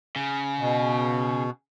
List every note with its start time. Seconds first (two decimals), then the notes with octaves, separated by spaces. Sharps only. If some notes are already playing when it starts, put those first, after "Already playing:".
0.16 C#3
0.59 B2